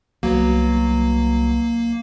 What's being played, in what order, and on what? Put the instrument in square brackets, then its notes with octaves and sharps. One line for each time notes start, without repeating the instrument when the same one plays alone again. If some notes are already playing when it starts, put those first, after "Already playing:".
[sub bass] C2 [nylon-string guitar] F#3 B3 [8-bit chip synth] A#3